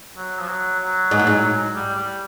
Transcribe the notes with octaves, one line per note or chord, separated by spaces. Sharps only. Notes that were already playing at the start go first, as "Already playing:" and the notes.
F#3
F3
F#3
F#3
G#2
A2
G#2
G3
G3